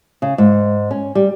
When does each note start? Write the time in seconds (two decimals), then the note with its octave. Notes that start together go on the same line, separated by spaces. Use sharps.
0.22 C#3
0.38 G#2
0.91 C#4
1.15 G3